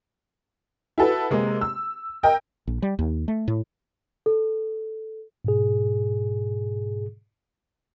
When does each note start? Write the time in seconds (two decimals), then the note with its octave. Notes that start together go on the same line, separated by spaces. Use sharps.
0.98 E4 F#4 A4 B4
1.31 C3 G#3 A#3
1.61 E6
2.23 A#4 D#5 G5
2.67 A#1
2.82 G3
2.99 D#2
3.28 A3
3.48 A2
4.26 A4
5.45 G#2 B2 G#4